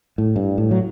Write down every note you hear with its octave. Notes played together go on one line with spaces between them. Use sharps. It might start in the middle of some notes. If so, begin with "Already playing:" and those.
A2
G2
A2
F#3